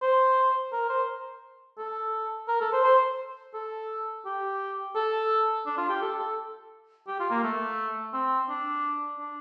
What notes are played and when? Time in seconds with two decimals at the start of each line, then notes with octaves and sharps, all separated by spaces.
0.02 C5
0.72 A#4
0.89 C5
1.78 A4
2.48 A#4
2.61 A4
2.73 C5
2.84 C5
3.54 A4
4.25 G4
4.95 A4
5.66 D4
5.78 F4
5.89 G4
6.01 A4
6.19 A4
7.07 G4
7.20 F4
7.31 A#3
7.43 A3
8.13 C4
8.49 D4
9.19 D4